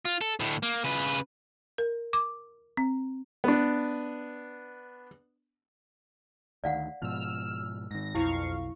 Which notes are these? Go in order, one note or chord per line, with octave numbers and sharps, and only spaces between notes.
F4
A4
D2 A2
A#3
C#3 B4
A#4
D6
C4
B3 D4
D2 D#3 D5 F5 F#5
G#2 B2 F3 E6 F6
G#2 D#3 A#6
B1 F2 E4 F5 C#6